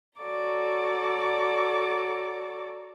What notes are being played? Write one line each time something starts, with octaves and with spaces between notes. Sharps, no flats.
F#4 A4 C#5 D5 A#5 D6